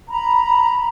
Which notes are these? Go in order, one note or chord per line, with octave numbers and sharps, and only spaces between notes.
A#5 B5